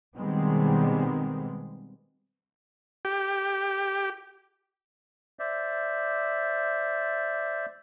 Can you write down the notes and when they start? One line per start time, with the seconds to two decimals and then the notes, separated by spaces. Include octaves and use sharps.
0.17 B2 D#3 G3 G#3 B3 C4
3.05 G4
5.39 C5 D5 E5